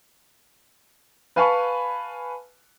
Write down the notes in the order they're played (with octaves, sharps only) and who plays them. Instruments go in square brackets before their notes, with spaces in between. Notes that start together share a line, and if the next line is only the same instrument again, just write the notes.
[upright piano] B4 F5 G#5 A5 B5 C#6